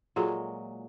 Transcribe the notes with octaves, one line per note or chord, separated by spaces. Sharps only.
A#2 F#3 G#3 F4 G#4 A4